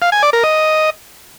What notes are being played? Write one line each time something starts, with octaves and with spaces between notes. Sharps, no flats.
F5
G#5
D5
A#4
D#5